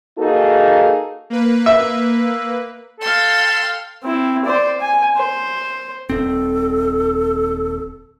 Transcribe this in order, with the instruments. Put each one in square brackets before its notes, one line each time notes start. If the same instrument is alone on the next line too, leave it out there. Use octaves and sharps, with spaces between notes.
[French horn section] A#3 D#4 F#4 G#4 A4
[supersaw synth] A#3 B4
[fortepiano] E5
[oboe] A4 [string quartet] F5 G5 C6
[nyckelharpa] C4 E4
C5 D5
G#5
C5
[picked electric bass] D#1 C4 [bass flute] A4